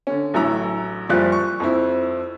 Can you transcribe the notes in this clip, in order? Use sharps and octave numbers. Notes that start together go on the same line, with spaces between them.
D3 C#4
A1 F#3 E4 A#5 E6
F#1 F3 G3 F4 D5 F#6
C#6
F2 C4 E4